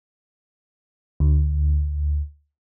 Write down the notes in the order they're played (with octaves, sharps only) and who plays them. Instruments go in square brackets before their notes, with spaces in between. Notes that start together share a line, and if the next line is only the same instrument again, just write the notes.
[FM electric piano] D2